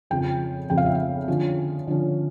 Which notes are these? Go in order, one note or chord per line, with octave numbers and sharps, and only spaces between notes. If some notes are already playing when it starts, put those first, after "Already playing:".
F2 C#3 F3 G5
F2 C#3 F3 G5
F5
E5
F5
D3 F3 C#4
D3 F3 C#4